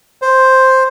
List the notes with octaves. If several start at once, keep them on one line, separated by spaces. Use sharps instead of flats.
C5